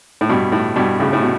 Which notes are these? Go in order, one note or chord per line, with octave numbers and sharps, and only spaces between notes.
A2
G2 B2
A2
G2 B2
A2 C#3
A2
B2